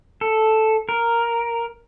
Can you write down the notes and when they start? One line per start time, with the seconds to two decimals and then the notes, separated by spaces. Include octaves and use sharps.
0.21 A4
0.89 A#4